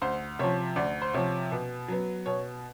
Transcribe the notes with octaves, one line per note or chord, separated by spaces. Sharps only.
D2 C5
C3 F3 C#5
D2 D5
C5
C3 F3 C#5
B2
F#3 B3
B2 C#5